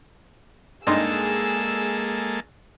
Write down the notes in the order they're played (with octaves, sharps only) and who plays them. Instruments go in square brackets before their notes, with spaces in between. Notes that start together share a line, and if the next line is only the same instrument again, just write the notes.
[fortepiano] G2 D#4 C6 [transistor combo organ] G#3 A#3 A4 [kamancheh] G#4 E6